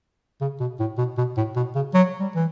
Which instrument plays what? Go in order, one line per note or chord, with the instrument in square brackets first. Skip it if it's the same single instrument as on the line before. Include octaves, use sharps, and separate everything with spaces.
[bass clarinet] C#3
B2
A2
B2
B2
A2
B2
C#3
F#3
G3
E3